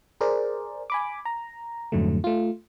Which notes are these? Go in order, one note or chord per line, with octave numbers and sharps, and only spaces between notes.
G#4 A#4 C5 D5
G#5 B5 D6
A#5
F2 G#2 D3 F#3 A3
A3 F4